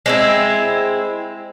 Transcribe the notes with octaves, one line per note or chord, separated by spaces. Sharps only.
G#3 C4 E4